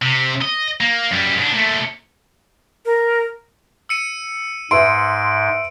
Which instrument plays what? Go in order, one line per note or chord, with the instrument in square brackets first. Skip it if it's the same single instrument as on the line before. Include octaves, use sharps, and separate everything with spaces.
[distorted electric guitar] C3
D#5
A#3
F#2 G3
G#2 D4
A#2 A3
[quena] A#4
[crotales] E6 C#7 D#7
[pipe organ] G#2 [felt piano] B4 E5 C6 [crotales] D7